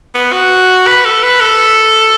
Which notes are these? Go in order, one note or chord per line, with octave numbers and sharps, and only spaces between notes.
B3
F#4
B4
A4
B4
A4